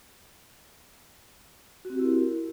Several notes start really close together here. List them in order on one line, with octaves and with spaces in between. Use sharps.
F#4 C4 G4 E4 A#4